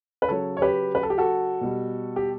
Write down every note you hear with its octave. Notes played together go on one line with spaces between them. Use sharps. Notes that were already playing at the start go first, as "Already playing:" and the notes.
B4
C#3 F#3 A4 C#5
C#5
G4 B4
B4
A4
G4
F#4 A4
B2 G3
G4